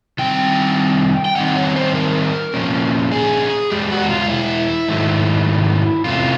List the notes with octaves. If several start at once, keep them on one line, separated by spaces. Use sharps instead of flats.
D#3 G3 C4 G5
G5
D#3 G3 C4 D#4 F#5
C#5
C5
A#4
A#2 F3 A#3 C#4
G#4
E2 B2 G#3 G4
F#4
F4
E4
G#2 D#3 F#3 A3
E2 C3 E3 A3 C#4 F4